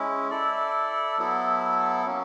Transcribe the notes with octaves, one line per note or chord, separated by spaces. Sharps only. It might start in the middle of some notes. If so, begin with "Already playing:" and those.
Already playing: G#3 C#4 E4
E4 A4 D5
F#3 B3 E4 A4
F#3 A#3 C#4